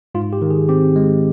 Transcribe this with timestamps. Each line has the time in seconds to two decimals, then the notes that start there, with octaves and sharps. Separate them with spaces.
0.15 G#2 F4
0.33 G4
0.42 D#3
0.50 G#4
0.69 C4 G4
0.96 G#3